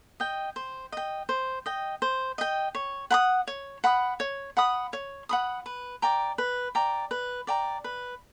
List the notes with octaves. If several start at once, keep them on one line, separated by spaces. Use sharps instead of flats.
D#5 G5
C5
D#5 G5
C5
D#5 G5
C5
D#5 G5
C#5
F#5 B5 D#6
C#5
F#5 B5 D#6
C#5
F#5 B5 D#6
C#5
F#5 B5 D#6
B4
D5 G5 A#5
B4
D5 G5 A#5
B4
D5 G5 A#5
B4